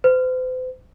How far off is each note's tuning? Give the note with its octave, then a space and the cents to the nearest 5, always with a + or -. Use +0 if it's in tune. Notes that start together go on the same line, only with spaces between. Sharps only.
C5 -40